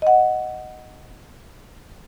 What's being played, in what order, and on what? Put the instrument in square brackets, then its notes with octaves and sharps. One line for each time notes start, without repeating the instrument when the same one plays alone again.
[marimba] D#5 F#5